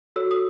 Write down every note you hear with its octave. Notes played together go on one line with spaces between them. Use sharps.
F#4 A4 C#5 E6
D#6